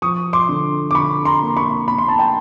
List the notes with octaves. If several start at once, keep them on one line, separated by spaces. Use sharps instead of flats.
F3 C#6 D#6
C6 D6
D3
D6
D3 B5 C#6
A#5 C6
A#3
B5 C#6
A#3 B5
C6
A5 B5
G5 A5